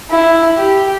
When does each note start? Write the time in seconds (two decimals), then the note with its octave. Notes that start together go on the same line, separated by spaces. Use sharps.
0.11 E4
0.57 G4